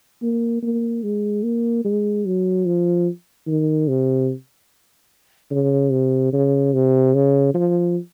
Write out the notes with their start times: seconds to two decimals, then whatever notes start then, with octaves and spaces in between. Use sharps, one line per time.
0.22 A#3
0.63 A#3
1.03 G#3
1.43 A#3
1.85 G#3
2.26 F#3
2.66 F3
3.47 D#3
3.88 C3
5.51 C#3
5.91 C3
6.33 C#3
6.73 C3
7.15 C#3
7.54 F3